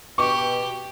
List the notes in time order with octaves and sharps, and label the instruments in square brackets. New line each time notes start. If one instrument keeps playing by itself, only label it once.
[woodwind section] B2 [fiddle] G4 [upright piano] C#6